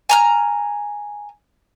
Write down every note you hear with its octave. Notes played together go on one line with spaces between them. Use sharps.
G#5 A#5 F6